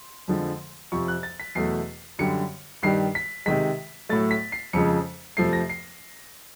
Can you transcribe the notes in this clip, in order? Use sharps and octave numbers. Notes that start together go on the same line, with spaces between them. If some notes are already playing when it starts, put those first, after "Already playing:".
Already playing: C6
F2 D3 F3 G#3
F2 C3 F3 C#6
F#6
A6
B6
E2 B2 F#3 A3 C7
F#2 D3 G3 C#7
G2 D#3 G3 C7
B6
C3 D#3 G#3 B6
A2 F#3 A3 A6
B6
C7
F2 C#3 F3 G#3 C#7
F2 C3 F3 A3 C7
A#6
C7